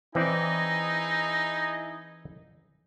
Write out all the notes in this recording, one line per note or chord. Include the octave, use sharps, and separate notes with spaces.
E3 C4 D#4 E4 G#4 D5 D#5